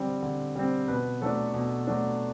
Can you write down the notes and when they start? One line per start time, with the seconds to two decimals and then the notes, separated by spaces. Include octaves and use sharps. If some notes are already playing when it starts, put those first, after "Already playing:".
Already playing: D3 G3 C4
0.22 D3
0.56 G3 C4
0.88 B2 B4
1.22 F#3 A3 D4 A4
1.54 B2
1.87 F#3 A3 D4